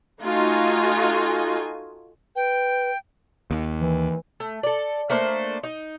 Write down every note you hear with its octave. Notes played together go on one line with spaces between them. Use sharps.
A3 D#4 F4 F#4 G#5
B4 G5
D#2
E3
A3
A4 D5
A3 A#3 D4 C5
D#4